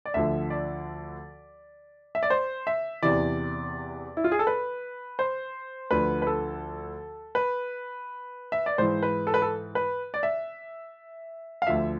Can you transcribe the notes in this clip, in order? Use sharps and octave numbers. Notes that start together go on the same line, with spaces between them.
D5
D2 D3 F3 E5
D5
E5
D5
C5
E5
E2 C3 E3 D5
E4
F4
G#4
A4
B4
C5
D2 D3 F3 B4
B4
A4
B4
E5
D5
G#2 E3 C5
B4
A4
B4
A4
B4
D5
E5
F5
D2 D3 F3 E5